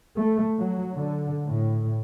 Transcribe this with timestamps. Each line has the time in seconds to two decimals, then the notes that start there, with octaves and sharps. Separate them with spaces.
0.20 A3
0.58 F#3
0.95 D3
1.46 A2